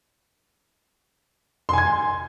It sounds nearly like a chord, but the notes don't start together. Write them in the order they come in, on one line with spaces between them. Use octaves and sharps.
C6 G#5 G#6